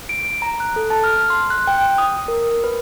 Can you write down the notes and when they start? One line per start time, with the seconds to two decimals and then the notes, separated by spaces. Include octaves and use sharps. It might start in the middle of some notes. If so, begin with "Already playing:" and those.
0.09 D7
0.42 A#5
0.60 F#6
0.76 A4
0.90 A5
1.04 F6
1.30 C6
1.50 F#6
1.67 G5
1.98 D#6
2.28 A#4
2.64 B4